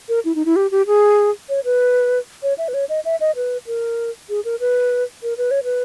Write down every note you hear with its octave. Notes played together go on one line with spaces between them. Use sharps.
A#4
E4
D#4
E4
G4
G4
G#4
C#5
B4
C#5
E5
B4
C#5
D#5
E5
D#5
B4
A#4
G#4
A#4
B4
A#4
B4
C#5
B4